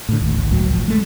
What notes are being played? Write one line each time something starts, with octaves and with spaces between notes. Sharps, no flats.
A2 D3
A1 D#2
G#1 D2
G1 C#2 A2 F#3
E1 F3
G#3 A3